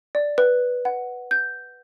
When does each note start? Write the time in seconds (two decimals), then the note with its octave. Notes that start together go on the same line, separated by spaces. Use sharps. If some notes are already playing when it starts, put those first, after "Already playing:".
0.15 D5
0.38 B4
0.85 F#5
1.31 G6